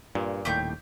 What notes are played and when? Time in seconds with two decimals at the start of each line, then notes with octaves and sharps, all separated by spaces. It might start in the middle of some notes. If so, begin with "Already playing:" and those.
0.15 G2 A#2
0.45 D#1 D#2 A2 G4 C#6 G6